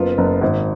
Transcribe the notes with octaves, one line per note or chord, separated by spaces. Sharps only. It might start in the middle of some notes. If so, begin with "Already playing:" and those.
Already playing: F#1 B3 F4
F#1
G#1